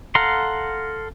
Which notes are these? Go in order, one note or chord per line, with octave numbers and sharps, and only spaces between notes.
A4 F5 F#5 A#5 C6